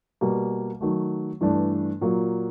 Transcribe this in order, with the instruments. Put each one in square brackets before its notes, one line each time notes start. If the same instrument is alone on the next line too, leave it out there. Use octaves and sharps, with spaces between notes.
[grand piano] B2 G3 A#3
D#3 F#3 A3
G2 E3 A3 D4
A#2 F#3 A#3